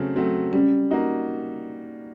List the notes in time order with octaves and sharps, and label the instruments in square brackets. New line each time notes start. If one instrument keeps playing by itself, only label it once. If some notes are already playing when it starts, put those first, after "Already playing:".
Already playing: [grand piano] C#3 F#3 A3 C4
F#3 A3 C4
[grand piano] G3 [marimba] C#4
[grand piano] A#3 D#4 F#4